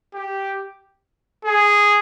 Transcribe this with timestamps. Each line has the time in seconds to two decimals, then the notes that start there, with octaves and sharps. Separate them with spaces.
0.14 G4
1.45 G#4